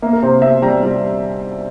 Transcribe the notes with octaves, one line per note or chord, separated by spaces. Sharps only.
A#3 E5
A#4
C3 C5
C3 E5
G3 A#5
G3